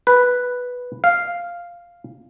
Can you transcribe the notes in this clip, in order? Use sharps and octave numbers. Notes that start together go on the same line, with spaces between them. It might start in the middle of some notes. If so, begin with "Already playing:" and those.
B4
F5